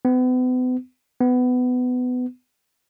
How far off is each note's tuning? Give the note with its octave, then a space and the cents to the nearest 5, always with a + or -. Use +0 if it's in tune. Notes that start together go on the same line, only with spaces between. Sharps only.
B3 +40
B3 +20